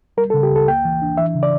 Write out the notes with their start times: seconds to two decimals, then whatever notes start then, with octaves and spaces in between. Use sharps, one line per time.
0.17 G3 A#4
0.30 A4
0.34 C#3
0.43 G4
0.52 C#2 A4
0.68 A#3 G5
0.85 E3
1.02 D4
1.17 E3 E5
1.35 C#3
1.43 D5